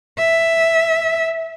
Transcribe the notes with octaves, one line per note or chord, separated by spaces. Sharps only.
E5